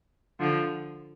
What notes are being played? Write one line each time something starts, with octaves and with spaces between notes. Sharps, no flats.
D3 F3